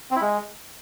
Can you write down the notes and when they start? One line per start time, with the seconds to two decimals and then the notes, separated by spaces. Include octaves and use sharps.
0.11 C4
0.16 E4
0.21 G#3